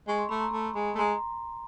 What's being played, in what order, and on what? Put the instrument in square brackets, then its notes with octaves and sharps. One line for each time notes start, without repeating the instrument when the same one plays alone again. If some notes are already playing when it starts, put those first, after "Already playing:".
[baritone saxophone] G#3 [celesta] C#6
[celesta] C6
[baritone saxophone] A3 [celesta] B5
[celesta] A#5 C6
[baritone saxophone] A3
G#3
A3
[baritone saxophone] G#3 [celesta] A#5 C6